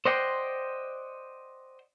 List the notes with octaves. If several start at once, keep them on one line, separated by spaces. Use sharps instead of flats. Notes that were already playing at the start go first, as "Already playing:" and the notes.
C5 D5 D#5 F#5 G5 C6